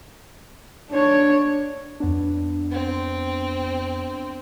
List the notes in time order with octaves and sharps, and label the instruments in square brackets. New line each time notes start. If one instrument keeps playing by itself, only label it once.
[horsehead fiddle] D4 C#5
[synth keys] F2 B3 D4
[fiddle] C4